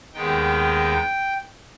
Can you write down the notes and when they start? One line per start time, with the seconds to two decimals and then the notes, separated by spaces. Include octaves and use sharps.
0.14 D#2 D#3 G#3 B3 D#4 G5